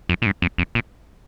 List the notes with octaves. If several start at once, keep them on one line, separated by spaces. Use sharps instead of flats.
F2
A#2
G2
F2
F2
A#2